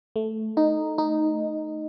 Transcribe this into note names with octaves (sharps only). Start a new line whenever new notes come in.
A3
D#4
D#4